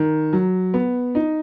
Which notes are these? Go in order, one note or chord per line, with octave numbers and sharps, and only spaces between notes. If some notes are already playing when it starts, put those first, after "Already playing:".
Already playing: D#3
F#3
B3
D#4